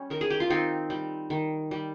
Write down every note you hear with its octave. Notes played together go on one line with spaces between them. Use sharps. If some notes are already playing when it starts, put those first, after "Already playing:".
Already playing: G3 C#4
D#3 A#4
G#4
G4
F4
D#3 C4 D#4
G3
D#3
G3